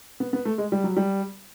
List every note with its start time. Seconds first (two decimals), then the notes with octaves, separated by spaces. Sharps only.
0.20 B3
0.33 B3
0.45 A3
0.58 G#3
0.72 G3
0.84 F#3
0.97 G3